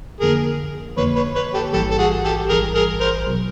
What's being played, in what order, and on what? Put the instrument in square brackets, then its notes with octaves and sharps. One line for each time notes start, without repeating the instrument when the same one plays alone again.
[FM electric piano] F2 D3 F3 A#3 [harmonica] G#4 A#4
[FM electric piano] F2 D3 F3 A#3 [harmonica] B4 C#5
[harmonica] B4 C#5
B4 C#5
G4 A4
[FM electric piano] A1 G#2 E3 G3 [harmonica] G4 A4
[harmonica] A4
F#4 G#4
G4 A4
[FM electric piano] A1 G#2 E3 G3 [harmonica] G#4 A#4
[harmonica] G#4 A#4
A#4 C5
[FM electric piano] B2 F#3